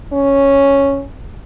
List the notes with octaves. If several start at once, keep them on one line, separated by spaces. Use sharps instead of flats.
C#4